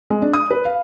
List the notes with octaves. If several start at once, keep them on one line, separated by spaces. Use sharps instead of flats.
G#3
D4
D#6
B4
F5